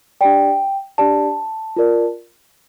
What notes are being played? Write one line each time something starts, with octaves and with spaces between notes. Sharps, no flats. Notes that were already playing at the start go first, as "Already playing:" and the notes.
D4 G4 D5 G5
D4 G4 D5 A5
F4 A#4 D5